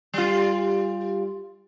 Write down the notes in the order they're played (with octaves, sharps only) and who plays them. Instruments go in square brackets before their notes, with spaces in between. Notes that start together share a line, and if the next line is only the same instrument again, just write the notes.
[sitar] G3 F4